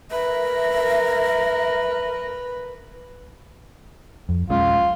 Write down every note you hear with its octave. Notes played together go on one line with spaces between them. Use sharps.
A#4 B4 E5
F2
B1 G#3 C#4 F4